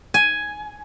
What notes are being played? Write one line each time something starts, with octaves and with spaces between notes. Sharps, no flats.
G#5